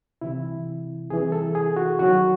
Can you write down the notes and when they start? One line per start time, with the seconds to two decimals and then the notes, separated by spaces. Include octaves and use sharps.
0.21 C2 C3 E3 E4
1.10 C2 C3 E3 G#4
1.32 A4
1.55 G#4
1.76 F#4
1.99 F#2 D#3 F#3 F#4